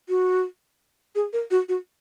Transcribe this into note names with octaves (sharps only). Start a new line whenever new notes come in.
F#4
G#4
A#4
F#4
F#4